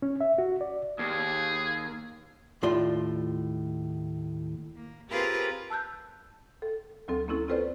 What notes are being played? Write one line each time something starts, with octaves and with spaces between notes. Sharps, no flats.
C#4
E5
F#4
D5
D#2 G#4
D#2 A2 F4 D5 C6
A#3
C4 F4 G4 G#4 A#4 B4
A5 E6 F#6 G6
A4
D2 F#3 C4 A4
A#3 C4 C#4 E4 A4
C4 F4 A4 B4 C5 D5